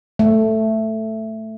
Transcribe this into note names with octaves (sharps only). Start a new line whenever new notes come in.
A3